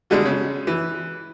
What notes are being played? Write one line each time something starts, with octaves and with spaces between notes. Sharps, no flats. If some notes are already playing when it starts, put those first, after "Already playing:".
B2 D3 G3 G#3
C#3
E3